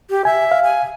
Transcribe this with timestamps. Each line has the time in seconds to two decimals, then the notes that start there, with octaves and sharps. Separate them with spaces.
0.10 G4
0.25 E5 G#5
0.52 F5
0.64 G#5